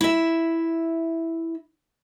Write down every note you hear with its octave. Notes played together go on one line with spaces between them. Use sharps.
E4 E5